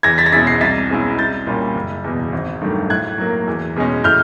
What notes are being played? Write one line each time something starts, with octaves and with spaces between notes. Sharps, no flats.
E2 G#6 A#6
A6 B6
A#6
B2 G#3 C#4 E4 A6 B6
A#6 C7
C2 A6 B6
B2 G#3 C#4 E4
C2 G6 A6
A#2 G3 A#3 C#4
F#1
E2 B2
G#1
G2 D#3 F#3 A3
A2 F#6 G#6
F#3 A#3
E2
B2 G#3 C#4
A2 F6 G6